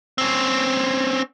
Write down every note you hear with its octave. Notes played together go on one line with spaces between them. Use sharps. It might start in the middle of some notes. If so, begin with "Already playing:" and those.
C4 C#4